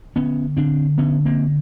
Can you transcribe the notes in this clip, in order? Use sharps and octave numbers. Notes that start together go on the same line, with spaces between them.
D3 B3 C#4
D3 C4 D4
D3 B3 C#4
A#3 C4